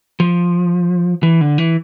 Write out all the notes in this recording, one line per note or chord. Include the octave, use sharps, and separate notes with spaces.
F3
E3
D3
E3